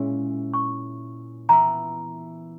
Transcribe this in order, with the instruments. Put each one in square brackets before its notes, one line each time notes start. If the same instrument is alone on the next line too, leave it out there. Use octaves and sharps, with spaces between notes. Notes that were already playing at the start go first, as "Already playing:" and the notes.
Already playing: [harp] A#2 G#3 C#4 E4
[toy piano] C#6
[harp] E3 B3 E4 [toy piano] A#5